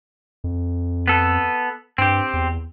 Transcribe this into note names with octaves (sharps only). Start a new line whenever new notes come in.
F2
B3 A4
G2 C4 G4
E2